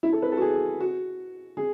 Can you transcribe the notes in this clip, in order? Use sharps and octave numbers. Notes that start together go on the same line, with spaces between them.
E4
A4
B4
A4
F#4
G#4
F#4
G#4